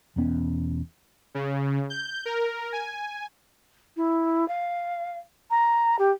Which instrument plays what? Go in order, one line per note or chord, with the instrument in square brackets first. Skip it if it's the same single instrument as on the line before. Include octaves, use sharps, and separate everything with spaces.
[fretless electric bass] E1 E2 B3 C#4
[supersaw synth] C#3
G6
A#4
G#5
[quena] E4
F5
A#5
G4